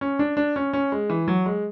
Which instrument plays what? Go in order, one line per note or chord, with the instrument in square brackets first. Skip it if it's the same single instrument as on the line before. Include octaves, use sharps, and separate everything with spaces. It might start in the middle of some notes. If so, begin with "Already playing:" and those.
[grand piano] C#4
D4
D4
C#4
C#4
G#3
E3
F#3
G#3